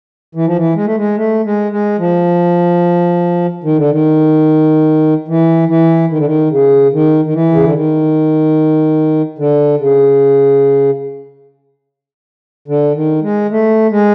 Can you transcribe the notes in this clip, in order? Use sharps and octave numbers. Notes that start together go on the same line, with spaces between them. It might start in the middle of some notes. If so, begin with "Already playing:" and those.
E3
F3
E3
G#3
A3
G#3
A3
G#3
G#3
F3
D#3
D3
D#3
E3
E3
D#3
D3
D#3
C#3
D#3
D#3
E3
C#3
D3
D#3
D3
C#3
D3
D#3
G#3
A3
G#3